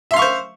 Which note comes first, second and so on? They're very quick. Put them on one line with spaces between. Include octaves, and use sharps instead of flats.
E5 C6 F5 C#6 C5